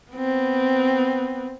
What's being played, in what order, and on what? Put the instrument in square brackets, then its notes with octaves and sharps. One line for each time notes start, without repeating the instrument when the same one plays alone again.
[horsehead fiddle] B3 C4